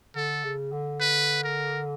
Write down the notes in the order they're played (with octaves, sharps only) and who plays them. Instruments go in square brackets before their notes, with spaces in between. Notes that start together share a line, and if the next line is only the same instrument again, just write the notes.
[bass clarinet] D3 [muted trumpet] A4
[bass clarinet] C#3
D3
[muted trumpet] B4
A#4